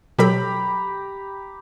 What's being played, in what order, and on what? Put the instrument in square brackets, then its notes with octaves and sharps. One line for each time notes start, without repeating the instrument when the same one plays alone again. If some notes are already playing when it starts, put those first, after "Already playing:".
[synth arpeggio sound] B2 F#3 A4 [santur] G4 A#5 B5